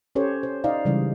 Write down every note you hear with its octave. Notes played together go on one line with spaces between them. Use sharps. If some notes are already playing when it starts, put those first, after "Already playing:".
C#4 G4 A4 C5 C#5
C5
D#4 C5 D5 D#5 F5
C#3 E3 G3 G#3